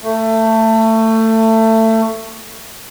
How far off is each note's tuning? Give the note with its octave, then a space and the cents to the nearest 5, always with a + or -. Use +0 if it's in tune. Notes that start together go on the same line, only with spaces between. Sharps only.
A3 +20